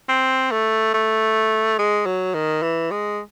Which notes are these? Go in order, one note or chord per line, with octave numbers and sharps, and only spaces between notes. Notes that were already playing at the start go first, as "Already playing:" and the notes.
C4
A3
A3
G#3
F#3
D#3
E3
G#3